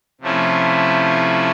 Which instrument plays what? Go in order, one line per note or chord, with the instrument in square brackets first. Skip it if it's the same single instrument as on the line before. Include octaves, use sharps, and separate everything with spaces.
[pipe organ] C3 F3 A3 C#4 E4